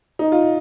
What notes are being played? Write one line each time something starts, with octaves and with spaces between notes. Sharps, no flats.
D#4
F4